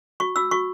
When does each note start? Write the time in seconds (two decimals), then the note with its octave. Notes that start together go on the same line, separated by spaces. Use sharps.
0.20 F#4 C#6
0.36 F#4 E6
0.51 F#4 C#6